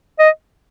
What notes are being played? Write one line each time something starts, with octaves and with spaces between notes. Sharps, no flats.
D#5